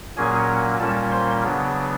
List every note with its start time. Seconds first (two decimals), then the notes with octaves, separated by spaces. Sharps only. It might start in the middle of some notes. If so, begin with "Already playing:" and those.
0.17 A#2 F#3 A#3 C#4 G#4 G#5
0.80 A#2 G3 A#3 C#4 A4 A5
1.11 C5 C6
1.44 C#3 F#3 B3 D4